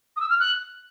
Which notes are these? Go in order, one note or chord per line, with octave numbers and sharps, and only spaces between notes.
D#6
E6
F6
F#6